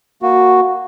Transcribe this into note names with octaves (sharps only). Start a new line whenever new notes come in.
A#3 F#4